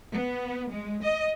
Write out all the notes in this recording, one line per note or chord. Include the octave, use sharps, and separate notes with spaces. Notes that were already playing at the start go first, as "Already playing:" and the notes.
B3
G#3
D#5